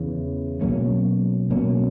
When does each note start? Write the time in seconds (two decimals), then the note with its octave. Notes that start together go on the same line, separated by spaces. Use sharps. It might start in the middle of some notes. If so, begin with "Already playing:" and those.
Already playing: E2 C#3 E3
0.61 B2 F#3 A#3 C#4
1.50 B2 F#3 A#3 C#4